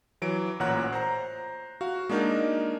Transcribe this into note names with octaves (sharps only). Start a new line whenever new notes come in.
E3 F#3 D7
A1 A#2 C#5 F#5 A#5 F#6
C5 A#5
F#4 F5
G#3 A#3 D4 D#4 A#4